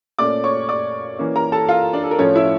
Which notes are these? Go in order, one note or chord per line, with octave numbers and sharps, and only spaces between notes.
A#2 A3 C#4 D5 D6
C#5 C#6
D5 D6
E3 A#3 C#4
A#4 A#5
A4 A5
F4 F5
D4 D5
A4
A#4
A2 F3 A3 C#4 C#5
E4 E5